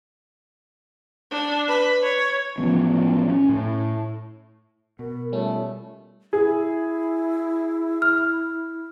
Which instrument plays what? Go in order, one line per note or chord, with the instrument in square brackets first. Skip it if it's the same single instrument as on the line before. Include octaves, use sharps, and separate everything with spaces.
[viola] D4
B4
C#5
[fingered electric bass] A1 F3 F#3 B3
C#4
A2
[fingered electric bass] B2 [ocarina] A#4
[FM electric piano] G3 C#4 [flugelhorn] A3 [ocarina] F4
[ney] E4 [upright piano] G#4
[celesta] F6